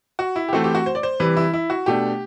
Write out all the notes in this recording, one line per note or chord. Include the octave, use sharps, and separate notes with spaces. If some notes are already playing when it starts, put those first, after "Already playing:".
F#4
E4
G4
E3 A3 C4 F#4
G4
F#4
C5
D5
C5
C3 E3 G3 B4
E4
E4
F#4
B2 A3 D4 G4